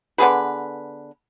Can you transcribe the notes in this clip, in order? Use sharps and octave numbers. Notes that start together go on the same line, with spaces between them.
D3 B3 G#4 B4